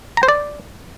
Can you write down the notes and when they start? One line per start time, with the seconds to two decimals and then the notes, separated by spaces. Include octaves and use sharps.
0.17 A#5
0.23 C5
0.29 D5